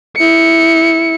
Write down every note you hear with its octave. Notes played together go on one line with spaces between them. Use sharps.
E4 C#7